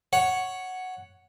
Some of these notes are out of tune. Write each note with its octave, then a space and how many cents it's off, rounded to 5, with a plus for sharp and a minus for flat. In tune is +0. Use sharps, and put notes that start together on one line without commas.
C#5 +0 F#5 +0